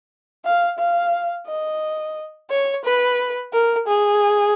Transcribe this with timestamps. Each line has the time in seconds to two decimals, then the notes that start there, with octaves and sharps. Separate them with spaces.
0.45 F5
0.79 F5
1.47 D#5
2.50 C#5
2.85 B4
3.53 A#4
3.88 G#4